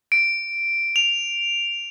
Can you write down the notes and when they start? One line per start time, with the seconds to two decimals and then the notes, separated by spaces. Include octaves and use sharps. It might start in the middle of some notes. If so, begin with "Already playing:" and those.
0.12 D7
0.96 F7